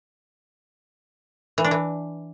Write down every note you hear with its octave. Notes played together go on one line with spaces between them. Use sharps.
E3
D4
E3